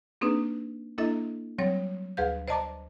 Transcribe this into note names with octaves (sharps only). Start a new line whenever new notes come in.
A#3 C4 D4 D#4 G#4 B4
A#3 D4 E4 A4 D#5 E5
F#3 G3 C4 C#5
D2 G#4 B4 F5 G6
C5 D5 D#5 A5 A#5 D6